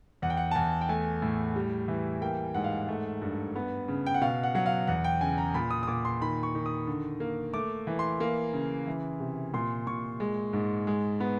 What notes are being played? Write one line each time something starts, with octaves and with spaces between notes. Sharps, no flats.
E2 F#5
G5
F#5
A5
E2 G#5
G5
A3 G#5
A2
G3
E3
A#3 G5
G#2 F#5
F5
F#5
A3
G2
B3
C#3
G5
F#5
B2 F5
F#5
F#3 F#5
F5
E2 F#5
G5
C#3 G#5
A#5
A#2 B5
D#6
D#6
A#2 D6
C6
D#3 B5
C#6
D#3
D#6
D3
A#3
A3 D6
E3
C6
A#3
C#3
E3
C3
A#2 C6
A#2 C#6
G#3
G#2
G#3
B3